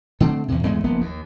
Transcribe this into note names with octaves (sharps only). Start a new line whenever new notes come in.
D3 A3 C4
E2 C3
E2 G#2 G#3 A3
F#1 F3 A#3 B3
D#2